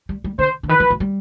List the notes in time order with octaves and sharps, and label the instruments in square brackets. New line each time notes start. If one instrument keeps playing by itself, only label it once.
[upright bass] G3
G3
[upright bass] D3 [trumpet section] C5
[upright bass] D3
[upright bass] D#3 [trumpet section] B4
[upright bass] F3
F#3
G3